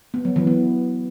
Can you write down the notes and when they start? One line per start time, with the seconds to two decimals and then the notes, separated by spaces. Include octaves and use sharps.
0.14 B3
0.25 F#3
0.36 E3
0.47 B3